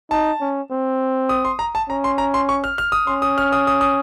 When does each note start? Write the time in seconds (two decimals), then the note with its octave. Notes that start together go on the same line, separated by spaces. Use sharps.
0.11 D#4 A5
0.41 C#4
0.71 C4
1.29 D#6
1.45 C6
1.59 A#5
1.75 A5
1.89 C#4 A#5
2.04 C6
2.18 A#5
2.34 C6
2.49 C#6
2.64 F6
2.78 F6
2.92 D#6
3.07 C#4 C6
3.22 D#6
3.38 F6
3.52 D#6
3.67 D#6
3.81 D#6